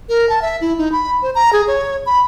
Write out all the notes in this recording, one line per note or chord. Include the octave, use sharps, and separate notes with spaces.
A#4
A5
E5
E4
D#4
B5
C5
A#5
G#4
C#5
B5